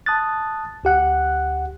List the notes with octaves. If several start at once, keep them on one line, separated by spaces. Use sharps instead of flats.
A5 D#6 F#6 A6
D2 G4 F#5 F#6